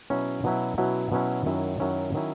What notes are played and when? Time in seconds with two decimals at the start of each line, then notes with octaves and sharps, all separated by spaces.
0.10 B2 F#3 C#4 E4
0.44 B2 F#3 C#4 E4
0.78 B2 F#3 C#4 E4
1.12 B2 F#3 C#4 E4
1.46 F#2 D#3 F#3 C#4 E4
1.79 F#2 D#3 F#3 C#4 E4
2.14 D#3 F#3 C#4 E4